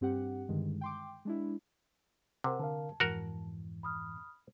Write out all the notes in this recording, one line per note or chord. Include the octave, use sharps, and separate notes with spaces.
G2 C4 G4 F#5
G2 D3 D#3 G#3
G5 C6 D6
G#3 D4 E4
C3 A#4 C5 F#5
D3 A#4 F5 A5
F2 G#2 E3 F#4 A#4
B5 D#6 F6